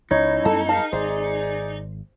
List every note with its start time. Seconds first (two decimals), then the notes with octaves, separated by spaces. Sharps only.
0.11 C#2 C#4 D#4 E4 C#5
0.45 F#2 G3 B3 A4
0.69 G#4 A#4 F5 A5
0.93 G#1 G#4 C5 D5